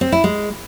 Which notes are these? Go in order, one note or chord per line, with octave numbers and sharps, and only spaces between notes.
C4
E4
G#3